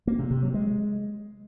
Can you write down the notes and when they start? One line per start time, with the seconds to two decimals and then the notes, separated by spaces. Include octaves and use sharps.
0.07 A#3
0.19 C3
0.31 C3
0.42 F#3
0.54 G#3